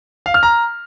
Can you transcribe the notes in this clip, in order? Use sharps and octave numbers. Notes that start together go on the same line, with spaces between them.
F5
F6
A#5